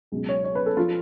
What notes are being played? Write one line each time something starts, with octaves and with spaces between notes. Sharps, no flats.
C#2 B2 F#3
C#5
C#5
B4
A4
F3 F4